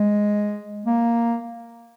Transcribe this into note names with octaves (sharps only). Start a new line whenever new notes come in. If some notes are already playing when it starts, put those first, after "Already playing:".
Already playing: G#3
A#3